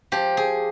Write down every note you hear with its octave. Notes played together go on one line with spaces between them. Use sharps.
F3 G4
G#4